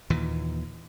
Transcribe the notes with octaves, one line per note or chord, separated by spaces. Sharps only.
D#2 A#2 E3